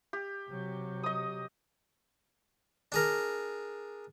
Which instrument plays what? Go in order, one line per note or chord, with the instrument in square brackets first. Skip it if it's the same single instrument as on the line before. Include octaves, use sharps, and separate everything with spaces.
[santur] G4
[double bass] C3 F#3
[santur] D#5 D#6
[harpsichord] D4 G#4 A#4